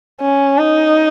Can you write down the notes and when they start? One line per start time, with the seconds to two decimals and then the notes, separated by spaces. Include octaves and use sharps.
0.21 C#4
0.58 D#4